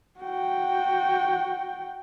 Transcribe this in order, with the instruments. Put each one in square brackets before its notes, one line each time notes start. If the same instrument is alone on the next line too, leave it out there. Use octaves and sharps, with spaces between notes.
[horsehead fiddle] F#4 G5